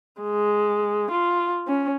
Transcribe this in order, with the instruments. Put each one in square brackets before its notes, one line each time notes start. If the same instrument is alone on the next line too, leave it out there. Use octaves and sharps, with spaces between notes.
[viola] G#3
F4
C#4